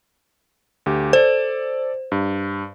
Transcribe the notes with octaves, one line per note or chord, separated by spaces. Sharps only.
D2 G4
A4 C5 D5
G2